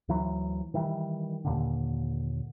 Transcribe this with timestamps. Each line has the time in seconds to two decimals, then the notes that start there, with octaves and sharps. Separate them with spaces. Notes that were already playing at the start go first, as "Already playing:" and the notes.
0.08 D2 E3 F#3
0.74 D#3 E3 G3
1.45 D#2 A#2 D3